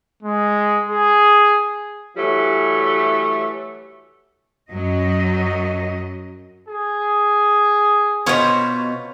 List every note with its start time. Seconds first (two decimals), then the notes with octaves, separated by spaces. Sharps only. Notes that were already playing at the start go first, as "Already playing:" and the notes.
0.23 G#3
0.89 G#4
2.17 E3 F#3 G3 A3
4.71 F#2 F#3 D#5
6.68 G#4
8.26 B2 B3 F4 C5 C#5